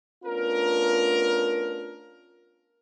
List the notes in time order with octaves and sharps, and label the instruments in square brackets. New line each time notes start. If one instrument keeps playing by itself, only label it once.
[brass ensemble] A3 B3 C#4 D4 F4 A#4